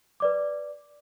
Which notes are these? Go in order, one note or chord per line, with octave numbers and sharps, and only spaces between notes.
B4 D5 D6